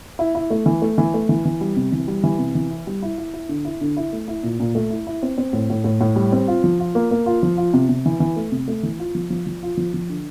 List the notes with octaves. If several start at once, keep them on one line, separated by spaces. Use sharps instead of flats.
E4
E4
A3
E3
A3
E3
A3
E3
E3
G3
C3
E3
G3
E3
C3
E3
E4
G3
E4
E4
E4
D3
E4
D3
E4
A3
E4
A#2
A#2
A3
E4
E4
C4
C4
A2
A2
A2
A2
G3
C4
F4
F3
F4
A#3
A#3
F4
F3
F4
C3
C3
E3
E3
A3
C3
A3
E3
F4
F3
F3
F3
F4
F3
F3
D3